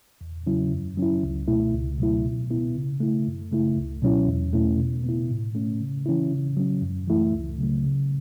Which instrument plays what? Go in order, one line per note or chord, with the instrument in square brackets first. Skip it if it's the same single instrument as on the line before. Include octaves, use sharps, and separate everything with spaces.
[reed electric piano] E2
C#3 F#3 C#4 E4
F#2
F#3 C#4 E4
C#2
B2 A3 E4
C#2
B2 F#3 A3 E4
B2
B3 E4
C#3
A3 E4
F#2
C#3 A3 E4
C#2
B2 F#3 C#4 E4
E2
B2 A3 C#4 E4
B2
B3 E4
A2
A3 C#4
C#3
E3 C#4 E4
C#3
F#3 C#4
F#2
E3 A3 E4
C#2
C#3 F#3 A3
C#3